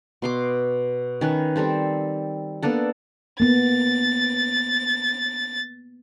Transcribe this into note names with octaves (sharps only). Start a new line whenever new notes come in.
B2 C6 D6
D#3 C#4 B4
G3 C4 A4 C5
A#3 B3 D4 A4
A#3 B3 A6